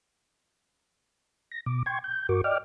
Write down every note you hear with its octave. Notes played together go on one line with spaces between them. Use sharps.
A#6
B2 D6
G5 C6 C#6 G#6
G6
G2 F#4 A#4 C#6 D6
D5 D#5 G5 D6 F6